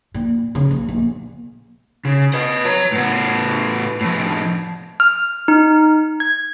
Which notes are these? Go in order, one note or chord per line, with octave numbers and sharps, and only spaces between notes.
A#2
C#3
A#1
A#1
C#3
B4 D#5
C#5 A#5
A2 B3
A2 F3
F6
D#4
G#6